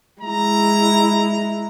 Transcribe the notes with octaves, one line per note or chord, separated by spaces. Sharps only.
G#3 E4 A#5